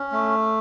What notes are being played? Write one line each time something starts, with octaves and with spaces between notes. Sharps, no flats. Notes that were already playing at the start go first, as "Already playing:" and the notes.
Already playing: C#4
A3